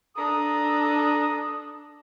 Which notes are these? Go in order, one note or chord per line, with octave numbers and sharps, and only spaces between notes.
D4 A4 A#5 D#6